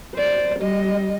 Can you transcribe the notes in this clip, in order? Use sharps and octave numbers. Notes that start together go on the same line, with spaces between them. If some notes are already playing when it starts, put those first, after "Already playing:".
C5 D5
G3 D#5